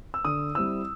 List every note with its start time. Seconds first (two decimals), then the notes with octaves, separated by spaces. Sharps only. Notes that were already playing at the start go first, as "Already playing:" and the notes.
0.14 E6
0.25 D3 D#6
0.55 G3 C4 E4 E6